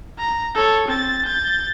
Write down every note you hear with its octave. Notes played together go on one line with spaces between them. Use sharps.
A#5
A4 C#5
C4 A6
G6 A6